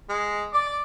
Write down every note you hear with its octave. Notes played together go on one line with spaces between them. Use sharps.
G#3
D5 D6